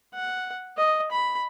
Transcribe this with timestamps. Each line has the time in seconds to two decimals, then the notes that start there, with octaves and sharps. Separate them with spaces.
0.14 F#5
0.77 D#5
1.11 B5